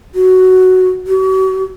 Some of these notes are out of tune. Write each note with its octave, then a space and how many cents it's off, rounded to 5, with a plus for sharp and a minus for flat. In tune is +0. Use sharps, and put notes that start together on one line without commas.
F#4 +5
F#4 +40